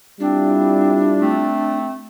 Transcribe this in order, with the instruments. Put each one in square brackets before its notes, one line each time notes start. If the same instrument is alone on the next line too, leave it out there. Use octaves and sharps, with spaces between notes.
[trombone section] G3 E4 F4 [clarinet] C4 [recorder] D4
[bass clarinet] A3 [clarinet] C4